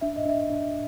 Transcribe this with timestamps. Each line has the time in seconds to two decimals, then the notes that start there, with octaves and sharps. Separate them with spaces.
0.01 D4 E5
0.16 D#5
0.25 D4 E5
0.50 D4